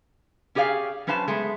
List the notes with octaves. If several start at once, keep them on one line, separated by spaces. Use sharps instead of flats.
C#4 G4 G#4 D5 F5
F#3 C#4 B4 C5 F5 A5
G#3 A3 B3